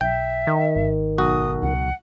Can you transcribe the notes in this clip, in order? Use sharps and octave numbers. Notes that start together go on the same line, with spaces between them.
B1 E5 G5
D#3
G#1
B1 F#4 D#6
C#2 F#5